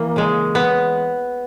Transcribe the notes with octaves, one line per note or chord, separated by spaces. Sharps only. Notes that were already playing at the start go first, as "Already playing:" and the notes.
Already playing: E3 A#3
C#3 G#3
B3